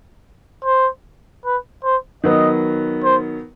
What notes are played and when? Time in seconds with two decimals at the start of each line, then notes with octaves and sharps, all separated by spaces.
0.64 C5
1.45 B4
1.84 C5
2.24 D#3 F#3 B3 D#5
3.04 C5